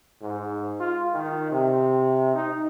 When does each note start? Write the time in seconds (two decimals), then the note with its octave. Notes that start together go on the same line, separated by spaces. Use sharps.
0.22 G#2
0.79 F4
1.13 D#3
1.51 C3
2.35 D#4